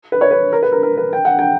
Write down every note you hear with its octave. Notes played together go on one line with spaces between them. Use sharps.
B4
C#5
B4
A#4
B4
A#4
A#4
B4
G5
F#5
G5